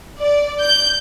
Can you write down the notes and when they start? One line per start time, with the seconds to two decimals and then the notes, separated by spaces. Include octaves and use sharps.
0.19 D5
0.60 G6